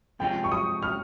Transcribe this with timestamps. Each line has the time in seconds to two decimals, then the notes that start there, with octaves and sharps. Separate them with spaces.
0.20 C3 F3 G#3 C#4 F4 G5
0.44 C#6
0.52 D#6
0.82 F6